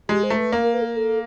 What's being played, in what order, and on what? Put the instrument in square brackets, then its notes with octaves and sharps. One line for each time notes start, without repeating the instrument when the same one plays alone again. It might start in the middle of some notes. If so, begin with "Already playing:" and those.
[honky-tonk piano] G#3 [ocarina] G4
[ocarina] C5
[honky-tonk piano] A3
[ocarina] B4
[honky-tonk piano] A#3
[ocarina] A#4
B4
A4
A#4
A4